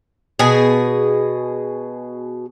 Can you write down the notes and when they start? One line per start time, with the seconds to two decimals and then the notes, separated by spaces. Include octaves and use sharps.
0.39 B2 G#4